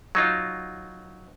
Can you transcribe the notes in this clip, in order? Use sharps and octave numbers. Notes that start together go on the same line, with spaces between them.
F#3 D#4 F4